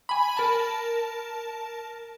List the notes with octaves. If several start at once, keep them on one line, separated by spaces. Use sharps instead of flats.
G#5 B5
A#4 A5